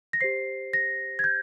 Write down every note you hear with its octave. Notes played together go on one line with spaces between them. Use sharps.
A#6
G4 C5 C7
A#6
G#6
G6